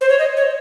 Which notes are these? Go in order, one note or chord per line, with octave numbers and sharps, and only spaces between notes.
C5
C#5
D#5
C#5